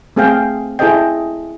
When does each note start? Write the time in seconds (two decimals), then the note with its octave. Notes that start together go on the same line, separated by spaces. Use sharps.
0.16 A3 C4 G#4 E5 F5 G5
0.79 E4 G#4 A4 C5 D#5 G5